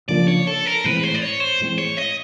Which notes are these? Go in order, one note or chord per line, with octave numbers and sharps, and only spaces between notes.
C#3 F3 A#3 D4 D5
C#5
A4
A#4
A2 E3 G#3 C4 B4
C5
D5
C#5
C5
A2 E3 G#3 C4
C#5
D#5